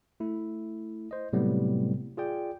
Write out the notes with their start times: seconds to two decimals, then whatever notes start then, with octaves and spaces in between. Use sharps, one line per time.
0.20 A3 E4
1.11 C5 D#5
1.33 A2 C3 F#3 G3 A3 B3
2.17 F4 G#4 D5 G5